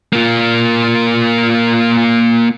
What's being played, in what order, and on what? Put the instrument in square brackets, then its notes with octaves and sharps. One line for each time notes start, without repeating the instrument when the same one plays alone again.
[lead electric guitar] A#3 F4